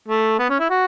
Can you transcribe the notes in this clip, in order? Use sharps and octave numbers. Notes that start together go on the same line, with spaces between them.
A3
B3
C#4
E4
F#4